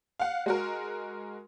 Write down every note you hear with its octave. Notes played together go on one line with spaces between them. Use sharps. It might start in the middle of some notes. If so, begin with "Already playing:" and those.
F5 F#5
G#3 F#4 A#4